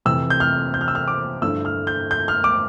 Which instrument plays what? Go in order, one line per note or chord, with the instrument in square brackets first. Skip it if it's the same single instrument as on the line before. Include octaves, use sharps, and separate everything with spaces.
[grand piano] F2 C3 E3 E6
G6
F6
G6
F6
E6
F6
D6
G2 D3 F3 A3 E4 E6
F6
G6
G6
F6
D6